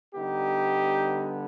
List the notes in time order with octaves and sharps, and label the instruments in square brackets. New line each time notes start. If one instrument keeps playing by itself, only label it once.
[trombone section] D3 G3 B3 D#4 G4